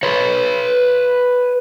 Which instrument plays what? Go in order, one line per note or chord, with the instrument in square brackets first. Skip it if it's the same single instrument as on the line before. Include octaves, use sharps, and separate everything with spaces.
[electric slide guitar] B4 C#5